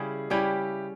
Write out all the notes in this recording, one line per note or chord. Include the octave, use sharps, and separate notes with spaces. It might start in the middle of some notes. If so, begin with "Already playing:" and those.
Already playing: C#3 G3 C#4 E4 G#4
C#3 G3 C#4 E4 G4